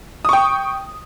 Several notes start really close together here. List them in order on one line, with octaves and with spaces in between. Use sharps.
D#6 C#6 G5